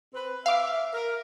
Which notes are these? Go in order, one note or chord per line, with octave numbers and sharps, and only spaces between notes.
C4 B4
E5 F5 D6
A#4